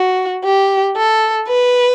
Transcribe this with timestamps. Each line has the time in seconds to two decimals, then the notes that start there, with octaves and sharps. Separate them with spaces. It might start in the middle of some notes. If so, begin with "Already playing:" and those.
Already playing: F#4
0.45 G4
0.97 A4
1.48 B4